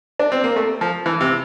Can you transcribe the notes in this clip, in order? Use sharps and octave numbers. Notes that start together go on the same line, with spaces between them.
D4
C4
A#3
A3
F3
E3
C3